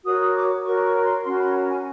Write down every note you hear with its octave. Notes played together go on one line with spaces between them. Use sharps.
F#4 A#4 C#5 D#6
D6
F#4 A#4 C#5 C#6
C#6
C6
C#4 F#4 A#4 C6
B5
A#5
G#5